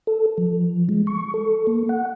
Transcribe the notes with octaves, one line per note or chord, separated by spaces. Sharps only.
A4
F3
G#3
C#6
A4
A#3
F#5